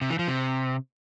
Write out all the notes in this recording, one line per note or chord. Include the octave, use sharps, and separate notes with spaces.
C3
E3
F3
C3